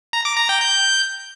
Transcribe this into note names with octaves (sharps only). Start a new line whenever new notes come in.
A#5
D6
A#5
G5
G6